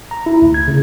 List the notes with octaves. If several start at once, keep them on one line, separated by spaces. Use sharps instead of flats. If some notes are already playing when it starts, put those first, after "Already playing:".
A#5
E4
D2
G#6
C#3